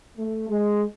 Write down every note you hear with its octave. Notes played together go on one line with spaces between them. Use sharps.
A3
G#3